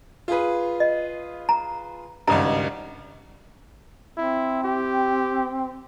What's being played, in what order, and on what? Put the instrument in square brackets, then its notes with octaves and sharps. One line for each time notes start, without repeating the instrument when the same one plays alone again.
[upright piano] F4 G#4 B4
[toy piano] D#5
A#5
[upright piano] G#1 C#2 G2 [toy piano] A#5
[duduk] C4 [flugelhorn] E4
[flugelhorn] G4